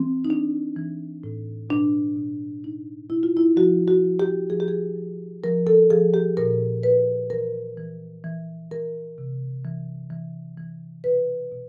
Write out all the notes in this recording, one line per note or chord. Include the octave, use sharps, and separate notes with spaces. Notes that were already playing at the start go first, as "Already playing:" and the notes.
Already playing: E3 C4
D#4
E3 D4
E3
A2
B2 D4
B2
B2 D#4
B2 E4
F4
E4
F3 F#4
F#4
F3
G4
F3 G#4
G4
G#4
F3
F3 A#4
A4
F3 G#4
G4
A#2 A#4
A#2 B4
E3 A#4
E3
E3
E3 A#4
C3
E3
E3
E3
B2 B4
B2